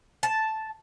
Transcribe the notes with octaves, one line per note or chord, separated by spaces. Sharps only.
A5